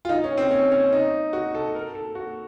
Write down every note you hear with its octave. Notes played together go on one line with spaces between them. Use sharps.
F4
D#4
C#4
C4
C#4
C#4
D#4
F#4
A4
A#4
A4
F#4